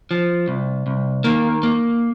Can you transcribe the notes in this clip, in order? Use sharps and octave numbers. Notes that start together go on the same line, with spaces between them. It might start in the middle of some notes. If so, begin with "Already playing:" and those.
F3
C2
C2
D#3 A#3
A#3